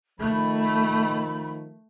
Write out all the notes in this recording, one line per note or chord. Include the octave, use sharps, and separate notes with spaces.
D#3 F3 A3 B5